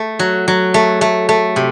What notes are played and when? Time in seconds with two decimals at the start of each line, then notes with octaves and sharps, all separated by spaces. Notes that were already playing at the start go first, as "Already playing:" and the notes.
Already playing: A3
0.19 F#3
0.48 F#3
0.74 A3
1.01 A3
1.29 A3
1.56 C3